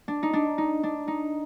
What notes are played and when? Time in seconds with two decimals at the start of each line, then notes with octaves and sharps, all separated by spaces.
0.08 D4
0.23 D#4
0.33 D4
0.58 D#4
0.83 D4
1.08 D#4